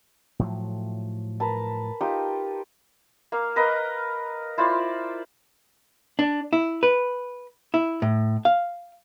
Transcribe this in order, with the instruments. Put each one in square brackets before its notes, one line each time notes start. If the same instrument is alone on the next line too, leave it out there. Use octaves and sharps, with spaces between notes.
[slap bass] A2 F3 F#3
[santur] A#4 B4 A5
D#4 F4 G4
A#3 F5
A#4 B4 D#5 F5
E4 F4 C5 D5
[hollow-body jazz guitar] D4
E4
B4
E4
A2
F5